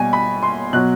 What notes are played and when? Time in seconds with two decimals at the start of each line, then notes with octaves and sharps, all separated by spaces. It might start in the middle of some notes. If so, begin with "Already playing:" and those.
Already playing: B2 G3 G#5
0.13 B5
0.43 C6
0.73 B2 F#3 F#6